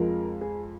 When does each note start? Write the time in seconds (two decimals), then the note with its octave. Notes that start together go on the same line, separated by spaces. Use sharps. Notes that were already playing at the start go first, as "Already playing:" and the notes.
Already playing: F2 F3 G#3 A#4
0.41 G#4